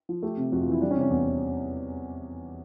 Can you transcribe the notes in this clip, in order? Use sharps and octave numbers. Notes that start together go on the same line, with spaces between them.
F3
A3 G4
C3
F2 F#4
F4
E3 E4
G3 D4
C#4
C3
C#4
E2